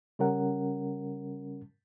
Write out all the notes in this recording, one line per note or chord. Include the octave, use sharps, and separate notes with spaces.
C#3 G3 C#4 A#4 F#5